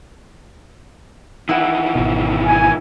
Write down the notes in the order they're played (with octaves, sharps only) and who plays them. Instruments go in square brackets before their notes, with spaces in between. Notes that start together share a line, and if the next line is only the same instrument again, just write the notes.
[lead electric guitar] D#3 E3 [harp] E4 F#5
[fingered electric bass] G#1 B2
[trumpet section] G#5